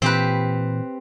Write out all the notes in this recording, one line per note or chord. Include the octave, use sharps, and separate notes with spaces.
A#2 E3 C4 G4 B4